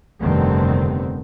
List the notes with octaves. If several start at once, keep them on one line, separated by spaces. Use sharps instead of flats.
F1 G2 D3 D#3 B3 C4